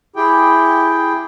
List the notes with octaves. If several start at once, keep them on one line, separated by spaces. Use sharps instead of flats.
E4 G4 G#4 G5